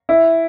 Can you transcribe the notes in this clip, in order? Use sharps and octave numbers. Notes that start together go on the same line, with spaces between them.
E4